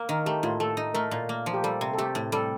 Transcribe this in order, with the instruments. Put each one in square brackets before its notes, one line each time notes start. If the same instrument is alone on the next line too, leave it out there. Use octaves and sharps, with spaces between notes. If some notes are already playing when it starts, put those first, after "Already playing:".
Already playing: [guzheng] A#3
[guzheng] D#3 [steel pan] A#4
[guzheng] A3 [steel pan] G4
[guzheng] A2 [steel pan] F4
[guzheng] A3 [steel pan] A4
[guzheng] D#4
[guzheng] A3 [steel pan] A#4
[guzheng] A#2
A#3
F3
[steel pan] G4
[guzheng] G3 [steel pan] A4
[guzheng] C3
[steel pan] A4
[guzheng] A3 [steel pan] G4
[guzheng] A2
[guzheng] G3 [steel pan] A4